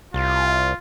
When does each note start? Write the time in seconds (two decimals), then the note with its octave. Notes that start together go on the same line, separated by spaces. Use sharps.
0.14 C2 F4